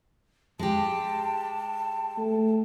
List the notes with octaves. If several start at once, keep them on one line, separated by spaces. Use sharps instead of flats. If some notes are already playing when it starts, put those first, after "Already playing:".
G#3 G4 A5
A3